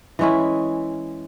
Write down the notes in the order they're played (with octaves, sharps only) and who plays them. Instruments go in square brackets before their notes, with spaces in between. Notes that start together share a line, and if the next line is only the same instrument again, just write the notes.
[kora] E3 G#3 C#4 E4